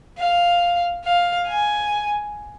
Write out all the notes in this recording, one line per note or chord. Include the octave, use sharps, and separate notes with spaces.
F5
F5
G#5